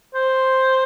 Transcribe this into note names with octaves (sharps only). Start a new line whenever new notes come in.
C5